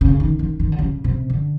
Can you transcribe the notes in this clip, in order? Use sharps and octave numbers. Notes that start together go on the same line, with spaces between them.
C#3
D#3
D#3
D#3
D3
C#3
C3
D3